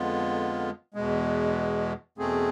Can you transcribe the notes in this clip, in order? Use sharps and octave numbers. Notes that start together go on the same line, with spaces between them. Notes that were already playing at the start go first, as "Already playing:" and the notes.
Already playing: F2 D3 G#3 B3 F4
E2 B2 G#3
E2 B2 A3 C4 G#4